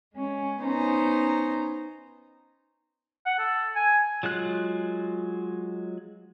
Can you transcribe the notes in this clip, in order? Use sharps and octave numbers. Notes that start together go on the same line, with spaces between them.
G#3 C#4
B3 C#4 D#4 C5 A#5
F#5
A4
G#5
F#3 G#3 F4 F#6